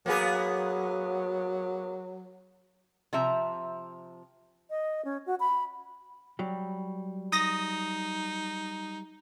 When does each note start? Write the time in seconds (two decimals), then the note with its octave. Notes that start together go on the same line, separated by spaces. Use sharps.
0.06 F#3 A#3 B3 G#4
3.13 C3 F3 E5 A#5
4.70 D#5
5.05 C#4
5.26 F#4
5.40 B5
6.39 F#3 G3
7.32 D#4 D#6 A#6